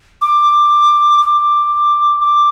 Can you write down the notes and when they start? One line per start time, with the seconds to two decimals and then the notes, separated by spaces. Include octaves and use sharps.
0.22 D6
1.21 D6
2.21 D6